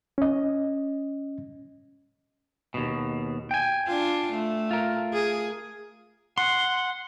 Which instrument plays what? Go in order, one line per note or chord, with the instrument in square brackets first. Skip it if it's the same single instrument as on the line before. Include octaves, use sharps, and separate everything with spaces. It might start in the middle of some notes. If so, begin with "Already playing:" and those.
[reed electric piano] C#4 D#5
[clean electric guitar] D#2 B2
G5 G#5
[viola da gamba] D4 F4
A3
[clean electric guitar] F4 A#4
[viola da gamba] G#4
[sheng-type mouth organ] F#5 [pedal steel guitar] C6